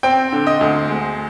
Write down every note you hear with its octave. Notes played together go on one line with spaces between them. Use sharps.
C4 G5
D3
D#5
D2
G#3